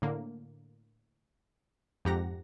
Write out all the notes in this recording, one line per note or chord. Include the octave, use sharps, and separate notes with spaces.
A2 D3 A#3
F2 G#2 G4 F#5 A#5 A#6